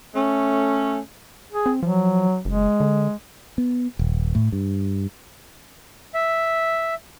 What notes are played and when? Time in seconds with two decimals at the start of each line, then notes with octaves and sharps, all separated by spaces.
0.15 A3 C#4
1.52 G#4
1.66 C4
1.83 F3 F#3
2.45 F#1 G#3
2.80 D3
3.58 B3
3.99 D#1
4.35 A2
4.52 G2
6.14 E5